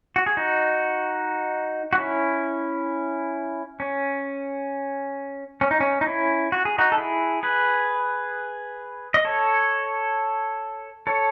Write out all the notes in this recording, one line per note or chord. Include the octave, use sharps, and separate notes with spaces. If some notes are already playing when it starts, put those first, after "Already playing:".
F#4
G#4
D#4 F#4
F#4
C#4 E4
C#4
C#4
D#4
C#4
D#4
C#4 E4
F#4
G#4
D#4 F#4
A4
E4 G#4
G#4 B4
D#5
A4 C#5
A4 C#5